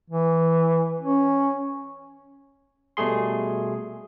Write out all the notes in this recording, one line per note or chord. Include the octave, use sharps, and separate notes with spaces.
E3
C#4
B2 G3 A3 G#4 C6